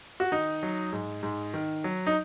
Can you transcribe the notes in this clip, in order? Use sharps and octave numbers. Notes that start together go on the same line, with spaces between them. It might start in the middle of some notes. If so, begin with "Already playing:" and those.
F#4
D#3 D#4
F#3
G#2
G#2
D#3
F#3
D#4